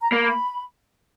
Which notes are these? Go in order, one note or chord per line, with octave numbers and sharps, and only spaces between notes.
A#5
A#3 B5